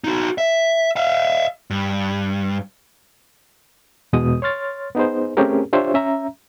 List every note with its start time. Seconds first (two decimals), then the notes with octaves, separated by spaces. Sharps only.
0.04 D#4 F#4
0.38 E5
0.96 E5 F5
1.71 G2
4.13 E2 B2 G#3 D#6
4.42 C#5 C6 F6 A6
4.95 B3 D#4 G#4 C5
5.37 A3 C4 C#4 G4 G#4 A#4
5.73 D4 F4 G4 C5 C#5 E5
5.94 C#4 E5 A#5